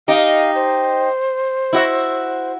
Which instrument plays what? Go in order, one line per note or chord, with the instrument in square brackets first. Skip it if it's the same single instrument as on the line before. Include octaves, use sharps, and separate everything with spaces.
[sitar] D#4 G4 [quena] F5
[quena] C5
[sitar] E4 F#4 E5